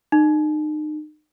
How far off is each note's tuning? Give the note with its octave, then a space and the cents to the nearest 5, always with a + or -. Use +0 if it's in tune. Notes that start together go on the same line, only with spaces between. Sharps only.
D#4 -35